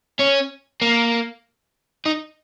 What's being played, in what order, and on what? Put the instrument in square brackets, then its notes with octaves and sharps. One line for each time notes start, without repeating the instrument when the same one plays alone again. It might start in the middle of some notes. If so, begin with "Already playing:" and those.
[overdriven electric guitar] C#4
A#3
D#4